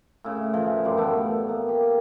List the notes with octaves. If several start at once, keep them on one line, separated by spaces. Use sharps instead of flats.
A2 C#3
A2 E3 F3
F#2 G3 D5 C6
A2 A3 B3 G5
A#3
G4